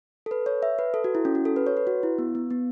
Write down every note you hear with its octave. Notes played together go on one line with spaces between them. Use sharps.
A4
B4
C#5
E5
B4
A4
F#4
E4
C#4
F#4
A4
B4
C#5
B4
F#4
E4
B3
B3
B3